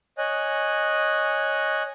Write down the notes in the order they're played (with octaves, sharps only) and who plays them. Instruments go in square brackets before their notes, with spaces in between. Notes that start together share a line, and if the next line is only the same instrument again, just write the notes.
[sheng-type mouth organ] C#5 D#5 G#5 F#6